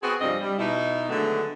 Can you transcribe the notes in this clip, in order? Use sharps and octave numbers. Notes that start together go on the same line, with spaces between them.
B3 C4 F#4 G#4
G2 C3 F3 G3 C4 D#5
G3
B2 D#4 E4
D3 D#3 F#3 G#3 A3 B3